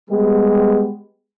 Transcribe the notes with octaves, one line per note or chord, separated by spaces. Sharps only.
G3 G#3 B3 G4